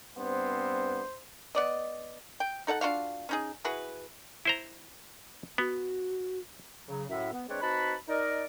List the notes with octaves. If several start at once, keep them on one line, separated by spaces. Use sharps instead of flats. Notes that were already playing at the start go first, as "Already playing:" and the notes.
G2 B3 C4 C5
B3 D5 D#5
G5
D#4 A4 E5 F#5
D4 F4 F#4 F5
C#4 D#4 G#4
E4 F#4 G#4 B4
E4 C5 A#5
B3 F#4
C#3 F#3
F#2 A2 D3 E5
B3
G#3 C4 D4 B4 C#5 D5
C4 D#4 F#4 B4 A5 B5
D#4 A#4 D5 D#5